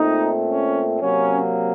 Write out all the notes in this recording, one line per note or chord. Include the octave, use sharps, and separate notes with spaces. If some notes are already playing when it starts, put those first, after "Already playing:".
Already playing: A#2 A3 C4 D#4
C#4
C3 F#3 A#3 C#4